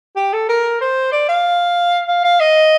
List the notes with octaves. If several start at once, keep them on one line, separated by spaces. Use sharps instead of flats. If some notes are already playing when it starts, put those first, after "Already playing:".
G4
A4
A#4
C5
D5
F5
F5
F5
D#5